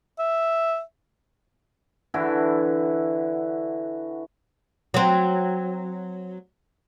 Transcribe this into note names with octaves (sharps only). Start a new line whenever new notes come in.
E5
D3 E3 E4 F#4
F#3 C4